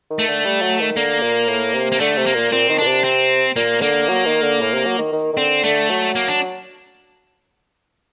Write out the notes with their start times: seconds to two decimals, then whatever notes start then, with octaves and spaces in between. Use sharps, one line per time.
0.10 D#3
0.19 A3
0.28 D3
0.45 G3
0.62 F#3
0.80 D#3
0.96 D3 A#3
1.22 A#2
1.48 A2
1.74 C3
1.92 A#3
2.00 D3 A3
2.18 C3
2.26 A#3
2.35 A#2
2.52 A#2 C4
2.69 D#3
2.78 A#2 D4
2.87 C3
3.04 C4
3.56 A#2 A#3
3.82 D3 A#3
4.08 F#3
4.25 D#3
4.42 D3
4.60 A2
4.73 C3
4.86 F#3
4.98 D#3
5.12 D#3
5.33 D#3
5.37 D3 C4
5.64 D3 A3
5.90 F#3
6.15 A#3
6.28 D4